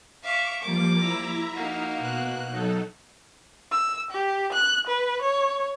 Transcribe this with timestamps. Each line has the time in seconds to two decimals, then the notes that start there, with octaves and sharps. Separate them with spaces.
0.22 E5 F5 C#6 D6
0.62 F3 G3 A#3 D6
0.98 E4 E5 A#5
1.54 A#3 D#4 F#4 F5
1.99 B2 F#6
2.50 F#3 D#4 A4
3.71 E6
4.11 G4
4.53 F#6
4.87 B4
5.22 C#5